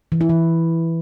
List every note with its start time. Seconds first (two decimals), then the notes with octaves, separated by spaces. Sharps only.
0.12 E3
0.21 E4
0.29 E3